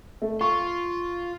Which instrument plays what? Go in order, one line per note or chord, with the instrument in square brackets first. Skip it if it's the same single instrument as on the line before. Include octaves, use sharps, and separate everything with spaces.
[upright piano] A3
[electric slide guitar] F4 [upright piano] C#6